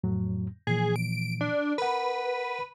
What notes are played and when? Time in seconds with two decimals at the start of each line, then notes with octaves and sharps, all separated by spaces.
0.04 F2 A2 F#3
0.67 A#2 E3 F3 G#4
0.96 D7
1.41 D4
1.78 A#4 B4 F#5